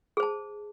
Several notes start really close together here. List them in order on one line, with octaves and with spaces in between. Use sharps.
G#4 C5 A5